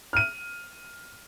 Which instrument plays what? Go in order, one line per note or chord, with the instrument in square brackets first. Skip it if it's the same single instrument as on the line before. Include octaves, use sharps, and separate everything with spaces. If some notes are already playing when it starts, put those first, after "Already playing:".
[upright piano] F6 D#7